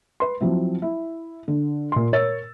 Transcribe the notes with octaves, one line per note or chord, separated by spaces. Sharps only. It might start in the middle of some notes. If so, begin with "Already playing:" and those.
B4 C6
F3 F#3 C4 E4
E4
D3
A#2 C6
A#4 C#5 E6 A6